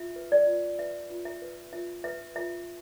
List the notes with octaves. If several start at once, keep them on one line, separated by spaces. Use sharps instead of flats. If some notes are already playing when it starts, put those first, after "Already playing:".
Already playing: F4 E5
B4
D5
F4
B4 E5
F4
E5
B4
F4 E5
B4 E5
F4 E5